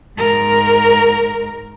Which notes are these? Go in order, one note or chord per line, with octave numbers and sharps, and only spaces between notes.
G#2 A#4